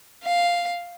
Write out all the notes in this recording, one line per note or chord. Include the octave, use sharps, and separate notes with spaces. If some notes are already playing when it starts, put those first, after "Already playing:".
F5